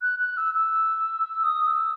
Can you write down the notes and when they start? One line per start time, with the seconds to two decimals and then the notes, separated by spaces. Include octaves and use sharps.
0.02 F#6
0.20 F#6
0.37 E6
0.55 E6
1.44 D#6
1.67 E6